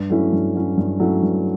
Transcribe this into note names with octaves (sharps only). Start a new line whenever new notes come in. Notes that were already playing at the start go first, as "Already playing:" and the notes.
Already playing: G2
F#3 A3 C#4 E4
G2
F#3 A3 C#4 E4
G2
F#3 A3 C#4 E4
G2